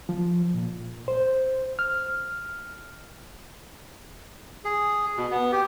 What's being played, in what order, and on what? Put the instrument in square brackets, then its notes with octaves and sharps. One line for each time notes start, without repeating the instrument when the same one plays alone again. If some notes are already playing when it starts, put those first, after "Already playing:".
[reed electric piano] F3
A#2
C5
F6
[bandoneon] G#4
B2
B3
G4